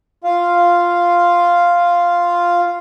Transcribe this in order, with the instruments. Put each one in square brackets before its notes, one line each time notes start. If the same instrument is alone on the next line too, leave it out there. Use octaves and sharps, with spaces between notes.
[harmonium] F4 F5